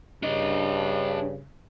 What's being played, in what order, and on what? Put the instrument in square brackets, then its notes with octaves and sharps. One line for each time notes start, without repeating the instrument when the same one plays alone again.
[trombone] G2 [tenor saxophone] C#3 [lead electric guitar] D4 D#5